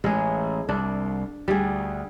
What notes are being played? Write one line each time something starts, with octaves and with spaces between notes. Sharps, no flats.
A1 G#3 G#4
C2 D4
D2 G3 G#4